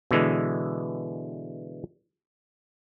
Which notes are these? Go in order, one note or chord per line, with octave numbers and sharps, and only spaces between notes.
B2 D3 E3 G#3